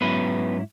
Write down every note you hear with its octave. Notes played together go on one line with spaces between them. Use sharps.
G#2 F#3 B3 C#4 E4 B4